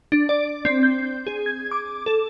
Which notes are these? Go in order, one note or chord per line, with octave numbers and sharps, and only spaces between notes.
D4
D5
C4
G6
G#4
G#6
D6
A4